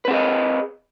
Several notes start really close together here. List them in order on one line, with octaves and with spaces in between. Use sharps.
B4 C4 G#4 D#5